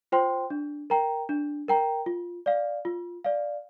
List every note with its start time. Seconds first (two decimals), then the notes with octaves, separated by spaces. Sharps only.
0.12 F4 C5 G5 C6
0.50 D4
0.90 A#4 G5 A#5
1.29 D4
1.68 A#4 G5 A#5
2.06 F4
2.46 D5 F5
2.85 F4
3.24 D5 F5